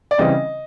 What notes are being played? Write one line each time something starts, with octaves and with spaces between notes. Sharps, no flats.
D5
C#3 E3 G3 C4 D#5